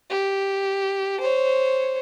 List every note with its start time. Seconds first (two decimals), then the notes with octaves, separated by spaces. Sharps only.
0.10 G4
1.20 C5 C#5